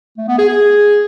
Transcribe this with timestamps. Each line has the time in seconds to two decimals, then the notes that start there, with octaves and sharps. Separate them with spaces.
0.17 A3
0.28 B3
0.38 G#4
0.49 G#4